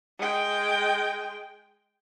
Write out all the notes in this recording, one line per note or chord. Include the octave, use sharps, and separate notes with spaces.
G#3 G5